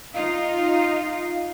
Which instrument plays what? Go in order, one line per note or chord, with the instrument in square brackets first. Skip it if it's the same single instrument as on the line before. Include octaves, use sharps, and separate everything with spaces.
[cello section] D#4 F4 [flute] F5